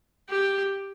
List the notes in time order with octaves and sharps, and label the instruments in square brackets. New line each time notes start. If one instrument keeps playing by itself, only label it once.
[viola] G4